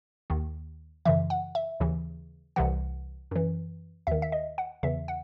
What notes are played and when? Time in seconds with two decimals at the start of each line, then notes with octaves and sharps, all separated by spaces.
0.30 D#2 D#3
1.05 F#2 C#3 E3 E5
1.30 F#5
1.55 E5
1.80 D#2 C#3 E3
2.56 C2 C3 E3 F#5
3.31 F#2 E3
4.07 D#2 D#3 E5
4.22 E5
4.32 D#5
4.58 F#5
4.83 E2 C#3 E3 E5
5.08 F#5